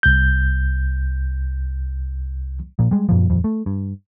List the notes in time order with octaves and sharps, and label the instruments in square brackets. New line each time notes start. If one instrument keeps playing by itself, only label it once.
[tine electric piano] C2 G6
[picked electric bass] A#2 F3
G3 G#3
F#2 A#2 F3
D#1 F2
A3
G2